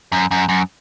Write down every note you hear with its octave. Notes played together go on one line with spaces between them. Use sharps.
F#2
F#2
F#2